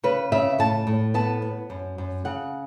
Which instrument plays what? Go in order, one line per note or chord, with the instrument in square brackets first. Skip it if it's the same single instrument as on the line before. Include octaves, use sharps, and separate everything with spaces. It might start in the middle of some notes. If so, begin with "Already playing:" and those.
[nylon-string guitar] C#3 B4
C#3 E5
A2 A5
A2
B3 A5
B3
F#2
F#2
C#3 F#5